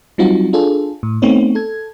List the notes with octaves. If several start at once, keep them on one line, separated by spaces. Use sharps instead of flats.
F#3 G3 C4 D#4 F4 F#4
D4 F4 G#4 A4
A2
A3 B3 C4 D#4 C#5
A4 G#6